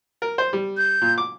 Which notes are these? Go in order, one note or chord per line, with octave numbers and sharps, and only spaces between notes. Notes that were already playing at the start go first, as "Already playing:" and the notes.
A#4
C5
G3
G6
A#2
D6